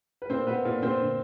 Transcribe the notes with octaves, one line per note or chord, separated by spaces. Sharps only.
B4
A#2 C4 C5
A#2 B3 B4
A#2
A#2 C4 C5
D3